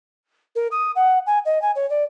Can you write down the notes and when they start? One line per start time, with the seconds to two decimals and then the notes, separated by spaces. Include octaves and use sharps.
0.56 A#4
0.71 D#6
0.96 F#5
1.27 G#5
1.45 D#5
1.62 G#5
1.76 C#5
1.90 D5